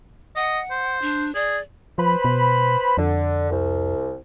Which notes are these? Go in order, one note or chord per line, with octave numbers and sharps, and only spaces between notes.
D#5 F#5
C5
D4
G#4 D5
F3 B4 C5 B5
B2
F2 D3
C2